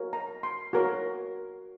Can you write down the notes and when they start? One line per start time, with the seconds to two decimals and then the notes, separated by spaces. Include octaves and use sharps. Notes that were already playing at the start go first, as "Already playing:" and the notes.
Already playing: F#4 A#4 C#5
0.13 A#5
0.43 C6
0.73 F#4 A#4 C#5